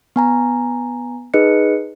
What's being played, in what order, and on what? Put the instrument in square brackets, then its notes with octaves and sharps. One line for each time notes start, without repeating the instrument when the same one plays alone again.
[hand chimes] B3 G#5 A#5
D#4 G#4 B4 D#5 F#6 C#7